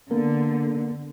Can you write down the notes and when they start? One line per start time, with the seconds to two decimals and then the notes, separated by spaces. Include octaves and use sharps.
0.11 D3 A#3 B3 A#4